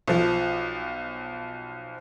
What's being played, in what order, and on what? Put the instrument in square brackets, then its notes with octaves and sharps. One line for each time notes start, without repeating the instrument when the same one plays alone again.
[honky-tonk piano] B1 F3